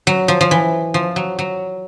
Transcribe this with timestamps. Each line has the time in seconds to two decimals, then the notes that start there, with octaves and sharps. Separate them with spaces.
0.07 F#3
0.28 F3
0.41 F3
0.51 E3
0.94 F3
1.16 F#3
1.39 F#3